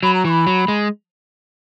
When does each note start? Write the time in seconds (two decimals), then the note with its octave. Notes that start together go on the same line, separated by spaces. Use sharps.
0.03 F#3 B5
0.14 A#5
0.24 E3 C#6
0.30 B5
0.47 F#3
0.68 G#3